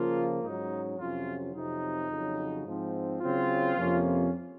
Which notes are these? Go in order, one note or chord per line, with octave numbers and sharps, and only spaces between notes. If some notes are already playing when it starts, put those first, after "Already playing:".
Already playing: C#3 F3 A#3 F4
G#2 F#3 C#4 D#4
F2 C3 F#3 C#4 F4
F2 C3 F#3 D#4
F2 C#3 F#3
G#2 F3 C4
C#3 F#3 C4 F4
F2 C3 F3 A#3 C#4